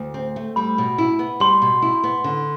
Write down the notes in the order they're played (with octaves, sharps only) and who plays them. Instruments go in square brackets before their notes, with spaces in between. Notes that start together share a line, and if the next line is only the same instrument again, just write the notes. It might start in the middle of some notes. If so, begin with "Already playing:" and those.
Already playing: [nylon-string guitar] D2
C4
A3
[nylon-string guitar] G3 [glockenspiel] B5
[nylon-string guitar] B2
E4
B3
[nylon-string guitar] G3 [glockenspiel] C6
[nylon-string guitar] B2
E4
B3
D3